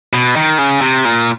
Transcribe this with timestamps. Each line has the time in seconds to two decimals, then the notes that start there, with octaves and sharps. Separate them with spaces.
0.13 B2
0.36 D#3
0.58 C#3
0.81 C3
1.05 A#2